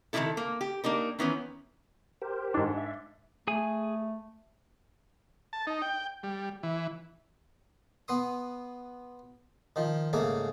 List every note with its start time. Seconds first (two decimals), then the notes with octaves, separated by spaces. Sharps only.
0.13 C3 D#3 F3 G3 E4 A4
0.37 A#3
0.61 G4
0.84 A#3 D4 D#4 A#4
1.19 D#3 E3 B3 C#4
2.22 G4 A#4 C5
2.54 G#2 D4
2.78 E5
3.48 A3 G#4 G#5
5.53 A5
5.67 D#4
5.82 G5
6.23 G3
6.63 E3
8.08 B3 C6 D#6
9.76 D#3 F3
10.13 G#2 C#3 A3 A#3 G#4